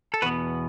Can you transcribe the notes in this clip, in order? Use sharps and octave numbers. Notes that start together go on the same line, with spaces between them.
A4
E2 B2 B3 F#4 B4